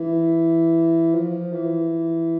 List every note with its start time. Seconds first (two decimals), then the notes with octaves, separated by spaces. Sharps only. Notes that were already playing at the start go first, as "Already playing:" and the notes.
Already playing: E3
1.15 F3
1.53 E3